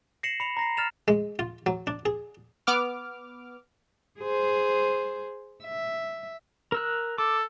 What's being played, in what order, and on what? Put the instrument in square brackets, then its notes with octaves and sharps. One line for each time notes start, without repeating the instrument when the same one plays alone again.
[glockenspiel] A#6 C7 C#7 E7 F#7
B5 C#7 F7
A#5 A#6 C7
F6 A6 E7 F7
[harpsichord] G#3
F4
F#3
D4
G#4
[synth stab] B3 D6 F6
[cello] G#4 C5
E5
[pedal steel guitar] A#4 E6 F#6
[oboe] A4 [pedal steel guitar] D6